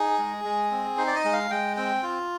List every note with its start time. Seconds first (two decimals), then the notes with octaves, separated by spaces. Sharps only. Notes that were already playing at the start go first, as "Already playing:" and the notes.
Already playing: D#4 G#4
0.19 G#3
0.44 G#3
0.71 C4
0.97 D#4 C5
1.07 D5
1.15 D#5
1.25 G#3
1.33 F5
1.50 G#3 G5
1.77 C4 G5
2.03 F4